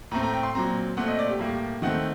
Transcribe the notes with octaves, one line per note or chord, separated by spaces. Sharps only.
A2 A3 C4 A#5
A#5
G5
C6
A#2 F#3 C4 A#5
A#2 A3 C4 F#5
D#5
D5
G4
A2 G3 A#3
D#3 A3 C4 F#5